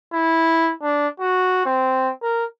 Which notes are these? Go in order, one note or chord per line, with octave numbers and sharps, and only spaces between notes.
E4
D4
F#4
C4
A#4